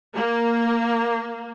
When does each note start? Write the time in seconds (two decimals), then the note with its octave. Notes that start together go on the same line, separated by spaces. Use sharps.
0.14 A#3